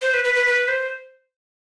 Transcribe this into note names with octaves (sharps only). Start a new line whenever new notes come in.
C5
B4
B4
B4
B4
C5